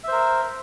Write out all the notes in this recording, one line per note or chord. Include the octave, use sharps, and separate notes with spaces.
A#4 C5 E5